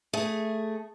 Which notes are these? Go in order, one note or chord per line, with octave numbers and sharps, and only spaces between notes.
A3 G#4